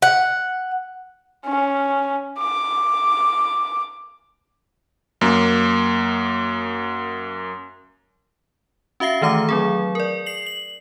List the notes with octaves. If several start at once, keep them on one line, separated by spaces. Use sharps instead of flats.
F#5
C#4
D6
F#2 A#3
C#4 F#4 E5 F5 C7
D#3 E3 A3 A#5 D6
F#3 C4 G#4
A#4 D5
C7 F#7
F#7